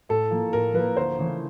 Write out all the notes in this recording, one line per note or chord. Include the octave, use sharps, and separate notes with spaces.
A2 A4
F3 A#3
A2 A#4
F3 A#3 B4
D2 C5
C#3 E3 A3